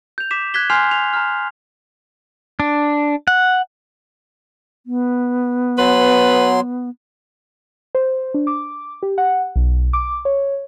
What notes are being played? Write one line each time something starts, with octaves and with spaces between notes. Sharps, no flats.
G6 F7
D6 B6 E7
F#6 G#6 B6 G7
G#5 C6 F6 G6 C7 F7
F7
A#5 F6
D4
F#5
B3
F#3 B4 C6
C5
D4
D6
G4
F#5
B1
D6
C#5